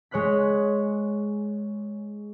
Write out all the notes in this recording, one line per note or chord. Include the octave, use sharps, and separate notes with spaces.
G#3 C#5 C6 F#6 B6